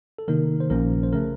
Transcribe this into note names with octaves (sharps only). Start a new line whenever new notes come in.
A4
C3 D#3 A#3 D#4 A#4
C5
A#1 A#2 F3 A#3 C#4 A#4
C5
C#3 A3 A#4